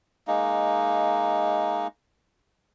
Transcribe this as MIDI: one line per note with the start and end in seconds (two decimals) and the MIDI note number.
0.27 1.87 56
0.27 1.87 58
0.27 1.87 63